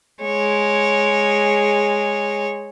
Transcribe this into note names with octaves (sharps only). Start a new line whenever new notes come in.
G#3 C#5